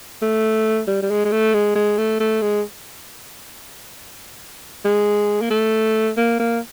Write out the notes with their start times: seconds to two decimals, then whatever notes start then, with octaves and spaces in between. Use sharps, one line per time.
0.22 A3
0.87 G3
1.03 G3
1.10 G#3
1.25 G#3
1.31 A3
1.54 G#3
1.75 G#3
1.98 A3
2.20 A3
2.42 G#3
4.85 G#3
5.41 A#3
5.50 A3
6.17 A#3
6.39 A#3